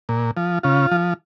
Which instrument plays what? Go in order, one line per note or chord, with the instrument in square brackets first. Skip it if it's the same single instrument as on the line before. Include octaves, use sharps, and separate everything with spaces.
[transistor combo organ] A#2
F3
C#3 F4
F3